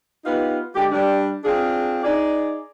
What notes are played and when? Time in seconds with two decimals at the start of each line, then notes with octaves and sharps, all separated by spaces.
0.24 B3 D#4 F4 G4 B4
0.75 D3 G#3 G4
0.90 G3 D4
1.44 C4 D4 F4 G#4
2.03 D#4 G#4 D5